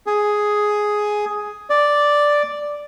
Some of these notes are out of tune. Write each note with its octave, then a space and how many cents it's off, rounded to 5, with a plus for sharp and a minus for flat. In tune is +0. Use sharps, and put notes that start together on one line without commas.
G#4 +5
D5 +0